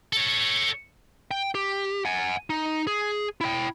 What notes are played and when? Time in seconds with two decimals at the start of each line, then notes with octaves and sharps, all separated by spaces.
0.13 A4 C#5
1.31 G5
1.55 G4
2.05 F#5 G#5
2.50 D#4
2.87 G#4
3.41 E4 G5